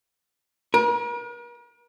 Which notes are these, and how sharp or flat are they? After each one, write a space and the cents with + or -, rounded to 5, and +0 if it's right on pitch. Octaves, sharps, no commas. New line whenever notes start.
A#4 +45